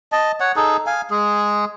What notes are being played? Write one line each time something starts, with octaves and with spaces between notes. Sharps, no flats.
D#5 A5
C#5 F#5
D#4 G#4 A4
F5 G#5
G#3 G#4